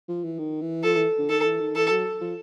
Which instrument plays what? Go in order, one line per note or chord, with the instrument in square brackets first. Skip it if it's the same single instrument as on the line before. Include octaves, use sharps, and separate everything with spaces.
[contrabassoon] F3
E3
D#3
E3
[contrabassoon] F3 [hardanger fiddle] A4
[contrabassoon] E3
D3
[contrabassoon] D#3 [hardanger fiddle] A4
[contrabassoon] E3
D#3
[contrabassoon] E3 [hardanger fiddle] A4
[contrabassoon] F#3
F3